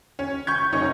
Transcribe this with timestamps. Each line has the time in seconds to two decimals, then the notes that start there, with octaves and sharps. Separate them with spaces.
0.19 C#4
0.47 C#6 G6 G#6
0.72 F#1 C#4 D#4 C#6